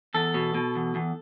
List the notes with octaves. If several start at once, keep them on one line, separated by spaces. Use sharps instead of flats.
E2 A4
B2
B2
E2
E2